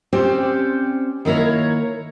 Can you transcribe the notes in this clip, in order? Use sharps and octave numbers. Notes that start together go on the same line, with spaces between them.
C4 C#4 G4 C5 D5
D#3 A#3 E4 A#4 C#5